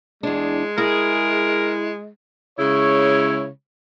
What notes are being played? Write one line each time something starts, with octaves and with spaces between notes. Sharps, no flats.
E2 G#3 D4
E4 G#4 A#4
C#3 G#3 E4 C#5